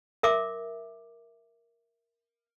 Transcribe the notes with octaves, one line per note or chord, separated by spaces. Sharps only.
A#4 E5 D6